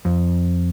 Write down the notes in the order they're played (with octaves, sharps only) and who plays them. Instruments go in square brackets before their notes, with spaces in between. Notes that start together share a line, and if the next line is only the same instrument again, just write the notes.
[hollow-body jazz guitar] F2